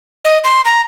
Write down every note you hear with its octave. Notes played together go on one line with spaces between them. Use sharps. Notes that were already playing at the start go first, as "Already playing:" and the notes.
D#5
C6
A#5